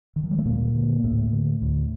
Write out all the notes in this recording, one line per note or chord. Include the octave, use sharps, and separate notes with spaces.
D#3
F3
G3
A3
D2 A#2 A#3
D3
D2 A2 A3
D3
D2